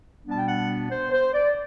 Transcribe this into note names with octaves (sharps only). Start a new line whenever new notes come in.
B2 G3 B3 D4 A5
G5
F#5
C5
C5
D5